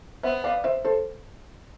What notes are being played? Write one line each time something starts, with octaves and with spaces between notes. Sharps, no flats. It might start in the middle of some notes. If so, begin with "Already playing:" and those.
B3 C5 E5
D5 F5
C5 E5
A4 C5